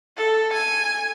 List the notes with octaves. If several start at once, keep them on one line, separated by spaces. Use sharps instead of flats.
A4
G#5